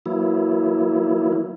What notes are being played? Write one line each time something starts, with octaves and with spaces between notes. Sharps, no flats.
E3 F#3 A#3 E4